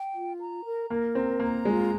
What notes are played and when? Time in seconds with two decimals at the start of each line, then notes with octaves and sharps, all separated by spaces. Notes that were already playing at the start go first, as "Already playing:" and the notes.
Already playing: G5
0.14 F4
0.40 A#5
0.64 A#4
0.90 A#3 A#4
1.15 C4 A#5
1.40 A#3 A#5
1.65 G#3 F4